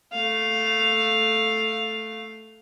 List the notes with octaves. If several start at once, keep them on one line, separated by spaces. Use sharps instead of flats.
A3 F5